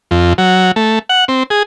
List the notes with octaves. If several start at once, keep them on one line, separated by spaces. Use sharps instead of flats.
F2
F#3
A3
F#5
C4
G#4